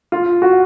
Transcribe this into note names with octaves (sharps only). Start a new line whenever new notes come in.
F4
F#4